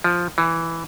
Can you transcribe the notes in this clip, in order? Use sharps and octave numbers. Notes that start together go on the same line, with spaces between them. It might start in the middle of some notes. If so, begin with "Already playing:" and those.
F3
E3